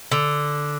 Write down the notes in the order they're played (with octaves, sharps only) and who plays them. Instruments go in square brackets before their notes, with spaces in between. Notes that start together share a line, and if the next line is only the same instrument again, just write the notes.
[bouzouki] D3